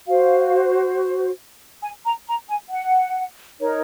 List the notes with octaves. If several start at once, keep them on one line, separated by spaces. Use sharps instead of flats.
F#4 C5 F5
G#5
A#5
A#5
G#5
F#5
D#4 A#4 C#5